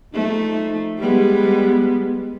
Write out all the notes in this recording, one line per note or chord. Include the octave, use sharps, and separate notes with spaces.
F3 A3 D#4
G3 G#3 B3